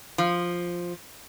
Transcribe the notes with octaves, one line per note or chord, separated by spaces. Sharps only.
F3